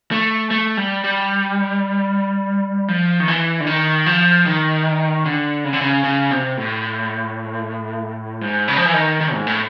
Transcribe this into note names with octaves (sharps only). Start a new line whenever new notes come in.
A3
A3
G3
G3
F3
D#3
E3
D3
D#3
F3
D#3
D3
C#3
D3
C#3
C#3
C3
A2
G#2
C#3
F3
E3
D#3
D#3
G#2
A2